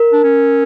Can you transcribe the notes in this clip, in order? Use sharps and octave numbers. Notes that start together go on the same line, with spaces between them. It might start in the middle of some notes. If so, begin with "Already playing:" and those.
Already playing: A#4
D4
C#4